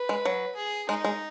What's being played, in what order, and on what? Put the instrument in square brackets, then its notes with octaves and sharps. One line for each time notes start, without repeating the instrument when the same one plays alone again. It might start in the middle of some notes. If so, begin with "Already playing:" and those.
Already playing: [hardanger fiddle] B4
[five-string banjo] G#3
F#3
[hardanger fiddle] G#4
[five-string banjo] G#3 [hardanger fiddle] D#4
[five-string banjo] G#3